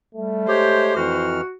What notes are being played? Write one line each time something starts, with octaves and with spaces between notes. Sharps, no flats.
G3 A3
G#3 G4 C5 C#5
F2 E3 F#4 F6